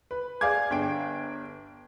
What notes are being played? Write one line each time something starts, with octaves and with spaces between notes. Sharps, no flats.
B4
G#4 D5 F5 G#5 D6 G#6
G1 D4 G5 D7